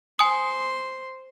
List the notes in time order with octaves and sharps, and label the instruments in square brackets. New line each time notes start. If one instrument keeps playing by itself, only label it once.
[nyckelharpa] C5 C6 [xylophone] G#5 D#6